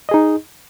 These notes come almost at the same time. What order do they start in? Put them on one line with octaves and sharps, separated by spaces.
D#5 G#4 D#4